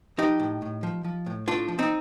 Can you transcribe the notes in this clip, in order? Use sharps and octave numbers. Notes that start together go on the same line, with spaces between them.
F3 D#4 G4
A2
A2
F3
F3
A2
A2 D4 F4
F3
C4 D#4